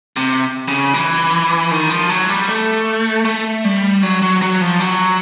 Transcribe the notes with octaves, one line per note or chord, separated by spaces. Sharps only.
C3
C#3
E3
D#3
F3
F#3
G3
A3
A3
G3
F#3
F#3
F#3
F3
F#3